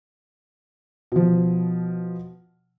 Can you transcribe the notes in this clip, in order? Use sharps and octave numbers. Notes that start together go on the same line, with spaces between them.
B2 F3